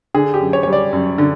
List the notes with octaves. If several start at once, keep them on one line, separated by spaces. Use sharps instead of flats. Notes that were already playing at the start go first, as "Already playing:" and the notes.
D3 G#4
G4
F#2
C#5
G3 C#5
D5
F#2
D3